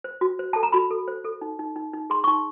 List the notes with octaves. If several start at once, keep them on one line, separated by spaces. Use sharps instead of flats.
C5
F#4
C5
A4 A5
A#5
F#4 B5
A4
C5
A4
D#4
D#4
D#4
D#4
G#4 C6
D#4 C#6